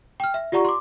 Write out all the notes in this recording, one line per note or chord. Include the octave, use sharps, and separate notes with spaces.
G5 F6
E5
F4 G4 D5 F#5 A#5 C#6
C6 D6